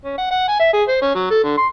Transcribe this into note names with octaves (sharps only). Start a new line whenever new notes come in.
C#4
F#5
F#5
G#5
E5
G#4
C5
C#4
F#3
A4
D3
C6